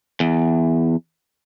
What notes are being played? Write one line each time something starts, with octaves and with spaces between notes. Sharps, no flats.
E2